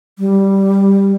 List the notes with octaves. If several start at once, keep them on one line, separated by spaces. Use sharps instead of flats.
G3